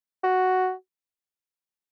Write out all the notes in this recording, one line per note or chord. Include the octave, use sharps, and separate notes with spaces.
F#4